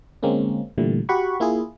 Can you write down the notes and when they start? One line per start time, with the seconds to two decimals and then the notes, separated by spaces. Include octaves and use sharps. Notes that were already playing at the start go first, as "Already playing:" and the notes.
0.23 D3 G#3 A#3 C4 C#4
0.78 A#2 D3 E3 G3 A3
1.09 F#4 G4 F#5 B5 C#6
1.40 A#3 E4 F4 G#4